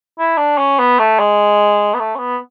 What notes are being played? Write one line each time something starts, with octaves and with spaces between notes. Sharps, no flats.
E4
D4
C#4
B3
A3
G#3
B3
A3
C#4
B3